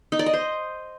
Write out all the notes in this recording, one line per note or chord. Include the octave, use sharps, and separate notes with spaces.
D#4
D5
D#5
C5